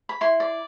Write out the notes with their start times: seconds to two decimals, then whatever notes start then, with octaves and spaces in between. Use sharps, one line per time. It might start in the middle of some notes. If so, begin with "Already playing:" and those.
0.09 B5
0.21 E4 C6
0.40 D5